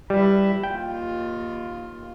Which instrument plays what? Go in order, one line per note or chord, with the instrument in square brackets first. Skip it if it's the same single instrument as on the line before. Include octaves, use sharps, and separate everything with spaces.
[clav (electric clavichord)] G3 [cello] E4 B4
[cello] D#2 F4 [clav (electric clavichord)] G5